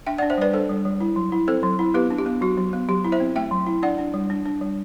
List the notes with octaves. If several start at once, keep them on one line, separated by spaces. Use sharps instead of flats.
D4 E5 G5
D5 F#5
D4
C5 E5
G3 B4 D5
D4 A4 C5
G3
G3
E4
F#3
E4
C4 A4 C5
F#3
E4
B3 G4 B4
D4
G4
B3
F#3 F#4
F#3
B3
F#3 G4
E4
C5 E5
C4
A3 E5 G5
F#3
E4
D4 D5 F#5
D4
G3
D4
D4
G3